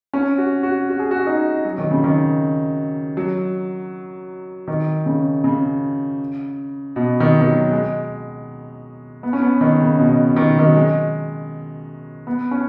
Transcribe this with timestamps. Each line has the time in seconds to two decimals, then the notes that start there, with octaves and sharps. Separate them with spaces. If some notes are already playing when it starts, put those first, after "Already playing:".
0.14 C#4
0.38 F#4
0.63 F#4
0.89 F#4
0.99 G#4
1.11 F#4
1.27 D#4
1.65 F#3
1.78 D#3
1.91 C#3
2.04 D#3
3.17 F#3
4.68 D#3
5.06 C#3
5.44 C#3
6.96 B2
7.20 D#3
7.41 D#3
7.46 F#3
7.71 G#3
9.23 B3
9.33 C#4
9.42 B3
9.61 D#3
9.80 C#3
9.99 B2
10.36 D#3
10.59 D#3
10.67 F#3
10.75 G#3
12.27 B3
12.51 C#4